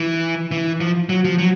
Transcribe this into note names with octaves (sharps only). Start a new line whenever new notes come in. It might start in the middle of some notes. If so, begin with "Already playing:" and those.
Already playing: E3
E3
F3
F#3
F3
F#3